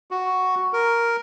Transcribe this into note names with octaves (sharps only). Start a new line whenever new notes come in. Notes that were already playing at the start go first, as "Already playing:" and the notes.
F#4
A#4